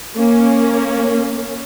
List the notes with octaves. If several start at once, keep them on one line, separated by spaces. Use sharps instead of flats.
A#3 C#4